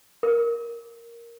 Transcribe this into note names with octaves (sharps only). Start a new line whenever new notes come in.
A#4